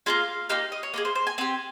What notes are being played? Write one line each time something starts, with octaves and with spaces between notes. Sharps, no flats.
A#3 C#4 F4 G#4 F5
A#3 D#4 G4 F5
D#5
C#5
A#3 F4 G#4 D#5
C5
C5
G#5
C4 G4 G#5